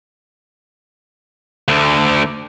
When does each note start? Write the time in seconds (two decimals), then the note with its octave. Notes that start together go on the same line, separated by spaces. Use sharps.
1.68 D2 D3